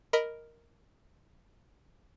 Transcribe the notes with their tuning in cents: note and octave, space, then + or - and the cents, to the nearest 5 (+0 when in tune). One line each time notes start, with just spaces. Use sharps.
A#4 +0 D#5 +0 B5 +0